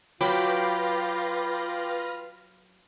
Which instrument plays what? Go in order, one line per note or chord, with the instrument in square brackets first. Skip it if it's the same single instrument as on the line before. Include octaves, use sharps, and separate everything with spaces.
[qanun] F#3 [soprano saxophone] F4 [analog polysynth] B4 F6 A#6 [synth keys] G5 B5 D6